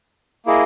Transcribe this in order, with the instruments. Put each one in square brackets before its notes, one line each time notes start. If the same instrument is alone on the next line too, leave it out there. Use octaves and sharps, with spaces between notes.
[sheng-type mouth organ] A#3 E4 G#4 D#5